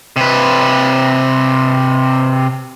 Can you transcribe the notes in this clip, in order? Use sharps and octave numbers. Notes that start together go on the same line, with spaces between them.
C3 B4